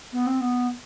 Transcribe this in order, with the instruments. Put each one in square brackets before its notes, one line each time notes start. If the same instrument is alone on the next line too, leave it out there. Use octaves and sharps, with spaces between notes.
[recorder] B3
C4
B3